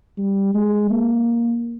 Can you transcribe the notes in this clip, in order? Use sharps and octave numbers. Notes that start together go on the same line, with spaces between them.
G3
G#3
A#3